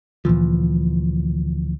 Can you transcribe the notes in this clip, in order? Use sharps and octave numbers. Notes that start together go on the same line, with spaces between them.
D2 A#2 E3 F3